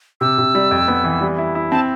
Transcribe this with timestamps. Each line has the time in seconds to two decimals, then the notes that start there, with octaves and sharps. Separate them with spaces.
0.21 C3 E6
0.38 C3
0.55 G3
0.71 F2
0.88 B3
1.04 E3
1.21 G3
1.38 E4
1.55 E4
1.71 C4 A5